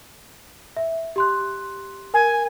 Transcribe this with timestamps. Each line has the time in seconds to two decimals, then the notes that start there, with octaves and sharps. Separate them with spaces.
0.77 E5
1.16 G4 C6 F#6
2.14 A#4 G#5